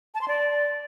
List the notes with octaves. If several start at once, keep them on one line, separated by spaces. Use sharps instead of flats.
A5
C6
D5